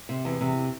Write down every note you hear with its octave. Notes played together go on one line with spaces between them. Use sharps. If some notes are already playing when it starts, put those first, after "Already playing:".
C3
E2
C3